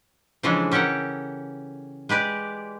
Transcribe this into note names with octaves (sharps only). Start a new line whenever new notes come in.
C#3 E3 F3 G#3 D4 A4
C#4 G4 A4 A#4 F#5
G#3 G4 B4 D5